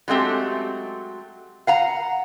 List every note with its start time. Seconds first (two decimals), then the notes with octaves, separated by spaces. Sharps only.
0.08 F#3 G#3 A3 C4 G4
1.67 F5 F#5 A#5